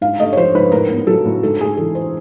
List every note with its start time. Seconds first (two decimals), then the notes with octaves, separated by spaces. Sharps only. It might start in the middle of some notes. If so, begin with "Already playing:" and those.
0.01 G#2 F5
0.19 A3 D#5
0.33 C#5
0.37 F3 C5
0.55 G#2 B4
0.72 A2 A#4
0.90 B3
1.07 F#3 A4
1.25 A2
1.43 G#2 A4
1.61 A3 G#4
1.77 E3 A4
1.95 C5